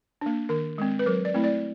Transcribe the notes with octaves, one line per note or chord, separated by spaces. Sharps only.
A#3 D4
D#3 A#4
G#3 C4
B4
F#3 A#4
D5
A3 C4 E4
D5